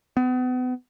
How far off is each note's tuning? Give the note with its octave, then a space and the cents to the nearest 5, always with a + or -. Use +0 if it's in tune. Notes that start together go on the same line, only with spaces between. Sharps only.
B3 +35